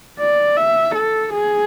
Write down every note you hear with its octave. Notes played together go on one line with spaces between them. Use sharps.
D5
E5
A4
G#4